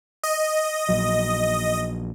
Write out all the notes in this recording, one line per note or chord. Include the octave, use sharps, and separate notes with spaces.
D#5
A#1 F#3